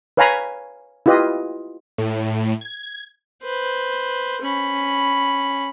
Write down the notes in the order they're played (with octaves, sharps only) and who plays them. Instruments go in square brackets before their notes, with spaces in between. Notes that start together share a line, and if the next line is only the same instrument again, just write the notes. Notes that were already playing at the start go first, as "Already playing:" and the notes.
[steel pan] B4 C#5 F5 G#5 A#5 B5
E4 F4 G4 B4 D#5
[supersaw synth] A2
G#6
[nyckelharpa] B4 C5
C#4 B5